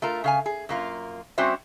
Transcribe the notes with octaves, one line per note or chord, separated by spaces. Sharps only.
A3 F4 A#4
C#3 F5 G#5
G#4
F#2 A#3 F4
G3 C4 C#4 F#4 C5 E5